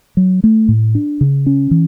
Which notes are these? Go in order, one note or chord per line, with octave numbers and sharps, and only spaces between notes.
F#3
A3
A2
D4
C#3
C#4
E3